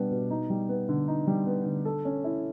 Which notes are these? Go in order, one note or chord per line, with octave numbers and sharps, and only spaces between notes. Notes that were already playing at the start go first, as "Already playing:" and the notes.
Already playing: B2 G3 B3 D4
B2
D#4
G3
B3
D3
D#4
G3
B3
D3
A4
C#4
E4